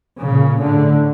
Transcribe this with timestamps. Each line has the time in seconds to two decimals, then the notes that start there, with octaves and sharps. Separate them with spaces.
0.21 A#2 C#3
0.60 A2 D3